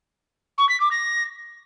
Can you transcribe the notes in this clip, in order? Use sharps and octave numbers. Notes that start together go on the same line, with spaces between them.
C#6
B6
D6
A#6